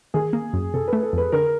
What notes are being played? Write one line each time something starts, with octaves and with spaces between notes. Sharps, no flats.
D#3 G#4
A#3
F#2
C3 A4
B4
A3
A4
F2 B4
D3 A#4